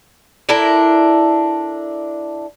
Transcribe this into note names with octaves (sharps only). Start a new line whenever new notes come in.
D4 E4 A4 A#4